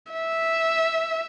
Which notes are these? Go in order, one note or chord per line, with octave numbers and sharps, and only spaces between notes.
E5